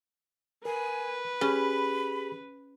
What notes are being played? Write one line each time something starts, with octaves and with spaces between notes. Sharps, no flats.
A#4 B4 G#5
C#4 G4 G#4 B5